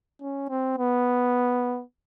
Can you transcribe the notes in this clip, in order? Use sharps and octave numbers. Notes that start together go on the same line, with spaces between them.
C#4
C4
B3